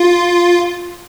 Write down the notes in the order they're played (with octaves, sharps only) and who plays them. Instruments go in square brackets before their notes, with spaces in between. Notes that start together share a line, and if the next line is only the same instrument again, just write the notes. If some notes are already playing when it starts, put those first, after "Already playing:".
Already playing: [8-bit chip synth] F4